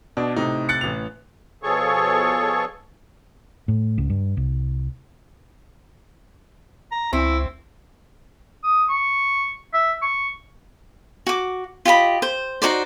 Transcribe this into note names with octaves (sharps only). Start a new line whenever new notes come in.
B2 D4
A2 C3 D#4
F#6 A6 C#7
A1 F7
B2 F3 G#4 A4 C#5 C#6
A2
C#2
G2
C2
A#5
C#2 C4 E4
D#6
C#6
E5
C#6
F#4 D6
F4 G4 D#5 B5
C5
D#4 F#4 C5 D5